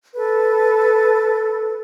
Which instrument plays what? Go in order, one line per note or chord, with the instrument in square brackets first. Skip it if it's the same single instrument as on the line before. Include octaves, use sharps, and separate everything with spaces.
[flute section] A4 B4